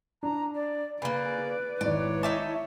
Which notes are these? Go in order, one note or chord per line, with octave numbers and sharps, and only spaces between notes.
D4 A#5
D5
C#3 A#3 B4 D5 B5
G#1 G#2 E4 C#5 D5
D#4 E5 A5 D6